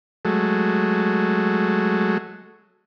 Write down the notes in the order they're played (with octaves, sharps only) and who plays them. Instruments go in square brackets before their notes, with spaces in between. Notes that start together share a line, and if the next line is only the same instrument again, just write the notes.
[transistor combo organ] F#3 G#3 A3